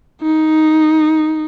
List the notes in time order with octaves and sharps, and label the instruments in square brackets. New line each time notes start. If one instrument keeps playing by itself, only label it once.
[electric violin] D#4